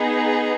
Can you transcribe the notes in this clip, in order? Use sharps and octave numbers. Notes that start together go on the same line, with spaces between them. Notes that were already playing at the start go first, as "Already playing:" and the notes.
Already playing: B3 D#4 G#4